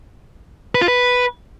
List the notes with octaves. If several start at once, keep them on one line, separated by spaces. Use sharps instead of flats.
B4
F4
B4